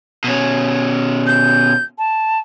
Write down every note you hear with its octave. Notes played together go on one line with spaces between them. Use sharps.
B2 C#4
G6
A5